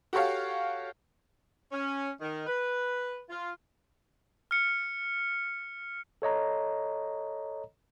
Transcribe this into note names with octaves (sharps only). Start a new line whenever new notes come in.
F#4 G4 A4 C#5 F5
C#4
D#3
B4
F4
F6 C#7
A4 C#5 D#5 A#5